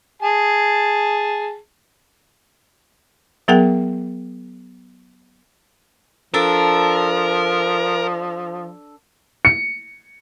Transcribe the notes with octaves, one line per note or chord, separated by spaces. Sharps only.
G#4 A5
F#3 B3 G#4 A#4 F#5 G5
F3 D4 A4 A#4
C#7